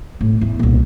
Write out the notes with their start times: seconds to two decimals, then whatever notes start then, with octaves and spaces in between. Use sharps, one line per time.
0.21 A2 A3
0.41 E2
0.59 C2 A#2